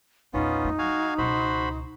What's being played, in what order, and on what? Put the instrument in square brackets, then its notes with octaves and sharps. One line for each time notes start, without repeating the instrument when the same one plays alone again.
[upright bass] A#1 E2 [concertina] B3 C#4 F4 [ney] D#4
[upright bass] F2 A3
[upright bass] G3 [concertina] F#4 F5 G#5
[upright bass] C#2 B2 [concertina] F#4 C5 B5